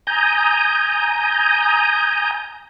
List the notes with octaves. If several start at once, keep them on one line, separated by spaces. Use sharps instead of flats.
G#5 A#5 D#6 G6